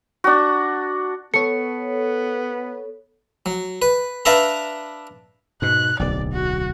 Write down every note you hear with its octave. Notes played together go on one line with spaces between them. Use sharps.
D4 F#4
B3 A4 C#5 C#7
F#3
B4
D4 B4 D5 E5 F5 A#5
G#2 B2 F#6
D1 B1 D5
F#4